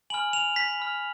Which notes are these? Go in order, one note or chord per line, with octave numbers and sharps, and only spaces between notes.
G#5 B5 F6 F#7
F7
B6
B5 F6